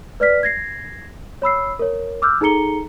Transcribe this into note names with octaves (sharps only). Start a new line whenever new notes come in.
B4 D5 F6 B6
G#6 A#6 C7
C#5 B5 E6 C7
A#4 C#5
D6 E6 F6 G6
D#4 G#4 A4 A#5 C#7 G7